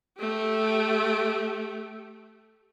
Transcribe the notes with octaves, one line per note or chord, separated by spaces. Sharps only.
A3 G4